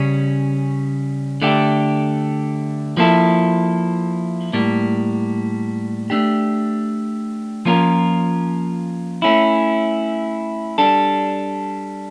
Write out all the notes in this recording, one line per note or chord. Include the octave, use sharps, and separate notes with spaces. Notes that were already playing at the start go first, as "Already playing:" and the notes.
Already playing: C#3 G3 C#4
D3 A3 D4 G4
F3 A#3 E4 A4
A2 G3 A#3
A3 D4 G4
F3 A#3 C#4 F4 A#4
A3 C#4 E4
G3 D4 A4